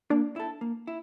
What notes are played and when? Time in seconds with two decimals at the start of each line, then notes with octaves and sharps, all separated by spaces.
0.10 A#3 D4
0.36 E4 A4
0.61 A#3
0.87 E4